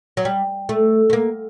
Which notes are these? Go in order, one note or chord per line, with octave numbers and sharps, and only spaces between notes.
F#3
G3
A3
A3
A#3